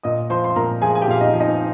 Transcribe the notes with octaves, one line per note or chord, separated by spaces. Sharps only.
A#2 D#5 D#6
F3 C5 C6
C6
A#2 A#4 A#5
F3 G#4 G#5
G#5
G4 G5
A#2 F5
D#4 D#5
F3
D#4 D#5